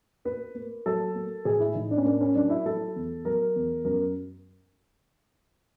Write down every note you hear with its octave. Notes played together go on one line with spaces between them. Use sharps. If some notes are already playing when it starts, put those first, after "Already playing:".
A#3 B4
A#3
F#3 A4
A#3
A2 G#4
E4
A2 D#4
D4
C#4
A#3 D4
C#4
F#3 D4
E4
F#3 A4
E2
F#3 A#4
E2
F#2 A#4